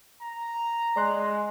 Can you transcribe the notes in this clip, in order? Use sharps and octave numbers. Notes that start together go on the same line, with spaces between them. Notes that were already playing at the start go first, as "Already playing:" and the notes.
A#5
G#3 D5 C6 F#6